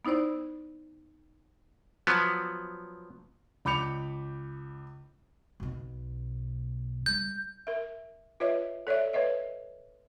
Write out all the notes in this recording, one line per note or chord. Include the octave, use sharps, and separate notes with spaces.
B3 D#4 E4 C5 D5
F3 F#3 B3
C#2 B5 D6 G6 C#7 F7
B1 B2
G3 G6
A#4 E5
F4 B4 C#5 D#5 E5
A4 C#5 D5 E5
B4 C#5 D#5 E5